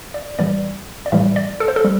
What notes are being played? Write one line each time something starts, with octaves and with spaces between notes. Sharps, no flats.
D5
A2 E3 G3 D5
D5
A2 E3 G3 E5
D5
A4
C5
A4
G3